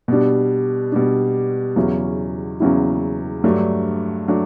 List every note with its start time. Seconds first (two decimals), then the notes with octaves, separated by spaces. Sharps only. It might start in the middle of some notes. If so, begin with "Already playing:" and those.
0.08 B2 G3 D4
0.92 B2 G3 D4
1.76 E2 C#3 F#3 C#4 E4
2.60 E2 C#3 F#3 C#4 E4
3.44 G2 F#3 A3 D4
4.28 F#3 A3 D4